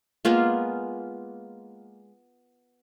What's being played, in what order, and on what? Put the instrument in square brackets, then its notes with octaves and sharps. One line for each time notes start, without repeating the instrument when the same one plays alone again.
[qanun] G#3 A#3 B3 F4